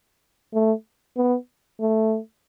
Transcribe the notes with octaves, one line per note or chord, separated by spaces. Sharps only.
A3
B3
A3